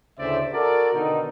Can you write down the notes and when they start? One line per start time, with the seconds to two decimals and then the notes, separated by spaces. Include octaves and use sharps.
0.19 D2 A2 C#3 C5 D5 E5
0.53 F#4 A4 A#4 D5
0.94 B2 D3 D#3 D#4